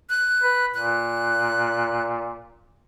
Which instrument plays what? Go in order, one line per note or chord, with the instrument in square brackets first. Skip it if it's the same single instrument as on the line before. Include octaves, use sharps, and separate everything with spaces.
[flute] F#6
[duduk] B4
[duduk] A#2 [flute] F#6